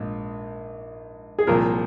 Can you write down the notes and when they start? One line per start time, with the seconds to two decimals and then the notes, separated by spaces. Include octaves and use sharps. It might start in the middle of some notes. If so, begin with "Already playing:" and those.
Already playing: A#1 G#2
1.39 G#4
1.47 C2 A#2 F3 A#4